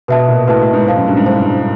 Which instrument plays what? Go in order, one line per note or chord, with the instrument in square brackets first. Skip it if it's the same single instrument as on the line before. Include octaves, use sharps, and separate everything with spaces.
[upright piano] B2 [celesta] B4 E5 A5
[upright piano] A#2
[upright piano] A2 [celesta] B4 E5 A5
[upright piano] A2
G#2
[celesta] C5 F5 A5
[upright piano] F#2
G2
G#2
[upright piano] A2 [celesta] C5 F5 A5
[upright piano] G2